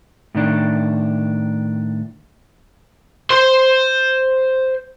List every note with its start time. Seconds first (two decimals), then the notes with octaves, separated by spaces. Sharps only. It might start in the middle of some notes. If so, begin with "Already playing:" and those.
0.35 A2 D#3 D4
3.30 C5 C6